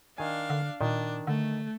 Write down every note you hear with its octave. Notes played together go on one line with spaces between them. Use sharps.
D#3 D4 F5 G#5
D3
A#2 D#3 D4
D3 A3